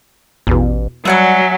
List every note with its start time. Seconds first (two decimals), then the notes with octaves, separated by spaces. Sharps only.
0.47 A1 E2 B2
1.05 F#3 G3 E5 F#5 G#5